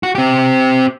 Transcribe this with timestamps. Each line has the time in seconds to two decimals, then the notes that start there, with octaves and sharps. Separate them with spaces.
0.03 F#4
0.15 C4 G4